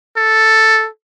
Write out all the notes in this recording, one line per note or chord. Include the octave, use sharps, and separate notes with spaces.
A4